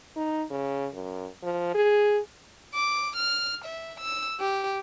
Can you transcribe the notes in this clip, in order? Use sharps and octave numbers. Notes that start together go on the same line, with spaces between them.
D#4
C#3
F#2
F3
G#4
D6
F6
E5
E6
G4